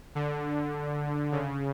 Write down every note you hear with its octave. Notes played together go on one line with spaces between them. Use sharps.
D3
C#3